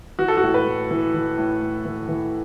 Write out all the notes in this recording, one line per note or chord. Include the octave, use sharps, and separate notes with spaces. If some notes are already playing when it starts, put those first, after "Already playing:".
E3 F#4
A4
F#4
A2
B4
A2
E3
E3
A2
A2
E3
E3